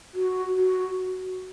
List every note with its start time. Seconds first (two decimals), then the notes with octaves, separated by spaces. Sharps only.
0.14 F#4
0.57 F#4